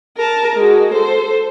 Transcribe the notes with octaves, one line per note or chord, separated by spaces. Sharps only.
A#4 A5
G#3 F#4
A4 C5